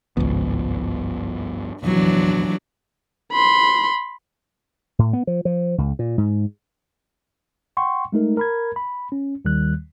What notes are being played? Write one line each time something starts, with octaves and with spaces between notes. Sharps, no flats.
G#1 C#2 G2 F3 B3
F1 A#1 E2 E3 F#3 D4
B5 C6
A2
B3
F3
F3
C#2
A#2
G#2
F#5 G5 C6 C#6
G#3 A3 D#4 A#4
A#4 B5 G#6
B5
C#4
D#2 D#3 G3 F#6